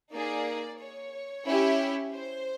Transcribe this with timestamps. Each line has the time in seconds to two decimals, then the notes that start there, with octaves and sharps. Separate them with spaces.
0.13 A#3 D#4 G#4 D5
0.80 C#5
1.46 C#4 E4 G4
2.12 C5